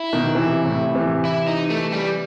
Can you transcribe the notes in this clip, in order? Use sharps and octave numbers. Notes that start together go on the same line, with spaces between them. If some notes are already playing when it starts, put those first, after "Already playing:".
Already playing: E4
B2 D#3
C3 E3
A2 C3
C3 E3
E4
D#4
A3
G3